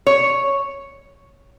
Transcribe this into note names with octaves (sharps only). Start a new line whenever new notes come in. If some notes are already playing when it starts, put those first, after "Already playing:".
C#5